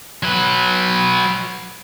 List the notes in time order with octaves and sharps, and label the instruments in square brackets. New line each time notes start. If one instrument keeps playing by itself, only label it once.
[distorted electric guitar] F#3 B4